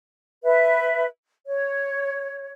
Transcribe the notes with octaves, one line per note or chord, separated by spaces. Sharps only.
B4 E5
C#5